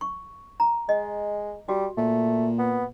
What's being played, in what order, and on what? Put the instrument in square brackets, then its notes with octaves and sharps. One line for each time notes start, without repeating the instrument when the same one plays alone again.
[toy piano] C#6
A#5
[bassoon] G#3 [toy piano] D#5
[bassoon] G3 [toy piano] F#4
[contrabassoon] A#2 [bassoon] A3
[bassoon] B3